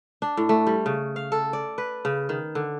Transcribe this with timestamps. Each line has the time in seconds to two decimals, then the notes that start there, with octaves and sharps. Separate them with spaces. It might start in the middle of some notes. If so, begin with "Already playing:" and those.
0.22 D4
0.37 A2
0.49 A3
0.67 G3
0.86 C#3
1.16 F5
1.32 A4
1.53 D5
1.78 B4
2.05 C#3
2.29 D#3
2.55 D3